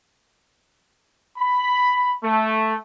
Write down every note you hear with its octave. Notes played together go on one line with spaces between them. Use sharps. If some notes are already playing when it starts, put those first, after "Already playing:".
B5
A3